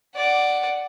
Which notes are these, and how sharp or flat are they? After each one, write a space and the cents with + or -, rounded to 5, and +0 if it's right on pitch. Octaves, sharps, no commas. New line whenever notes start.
D5 +0 F#5 +10